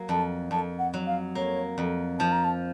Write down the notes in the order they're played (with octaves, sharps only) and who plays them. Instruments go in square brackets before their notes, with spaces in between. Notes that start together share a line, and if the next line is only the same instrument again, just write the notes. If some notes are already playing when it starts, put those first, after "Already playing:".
Already playing: [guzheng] F#3 A#3
[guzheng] F2 [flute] A5
[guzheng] F2 [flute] A5
[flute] F#5
[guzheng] F#3
[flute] F5
[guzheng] A#3 [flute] C#5
[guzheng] F2
[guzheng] F3 [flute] A5
[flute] A#5
A5